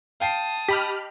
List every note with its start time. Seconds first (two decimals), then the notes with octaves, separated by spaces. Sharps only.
0.20 F5 G5 A5 D#6 C7
0.68 G4 D#5 B5 F6 B6